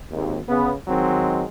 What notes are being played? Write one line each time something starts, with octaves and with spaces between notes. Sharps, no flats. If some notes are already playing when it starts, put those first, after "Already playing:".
G#1 D#2
C#3 B3
D#3 F#3 G#3 C4